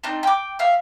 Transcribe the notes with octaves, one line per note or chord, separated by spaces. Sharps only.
C4 D4 D#4
G5 D6
E5 F5